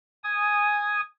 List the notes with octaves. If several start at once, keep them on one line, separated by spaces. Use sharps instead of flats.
G#5 D#6